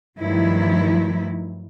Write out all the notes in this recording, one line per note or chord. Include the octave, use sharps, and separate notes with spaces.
G2 D#3 F3 F#3 A3 E4